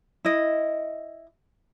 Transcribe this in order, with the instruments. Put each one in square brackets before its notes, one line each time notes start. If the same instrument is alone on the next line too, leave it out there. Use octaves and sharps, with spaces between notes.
[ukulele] E4 D#5